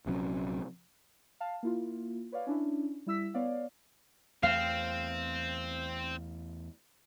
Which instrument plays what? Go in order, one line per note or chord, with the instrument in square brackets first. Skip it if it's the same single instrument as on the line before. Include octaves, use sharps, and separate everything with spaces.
[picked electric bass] A#1 C3 F#3 C#4
[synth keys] F5 A5
A#3 E4 F4
B4 C#5 D5 F5
C#4 D4 E4
G3 E4 E6 B6
B3 C#5 D5 F5
[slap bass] E2 A3 [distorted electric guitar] C4 [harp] F5